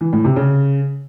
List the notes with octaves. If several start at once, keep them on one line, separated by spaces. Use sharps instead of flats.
E3
A2
C3
C#3